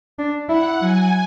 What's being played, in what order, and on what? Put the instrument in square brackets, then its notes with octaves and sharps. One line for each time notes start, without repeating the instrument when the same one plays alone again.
[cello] D4
[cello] E4 [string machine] F#5
[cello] F#3 [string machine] G#5